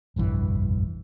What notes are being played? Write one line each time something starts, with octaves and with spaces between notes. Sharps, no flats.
F1 A#1 G2 E3